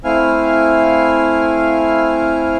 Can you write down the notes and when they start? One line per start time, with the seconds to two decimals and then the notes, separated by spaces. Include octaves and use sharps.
0.04 A3 C4 E4 F5 G#5 F6